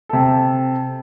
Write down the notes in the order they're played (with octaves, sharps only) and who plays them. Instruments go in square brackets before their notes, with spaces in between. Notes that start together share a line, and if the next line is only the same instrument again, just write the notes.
[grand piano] C3 A4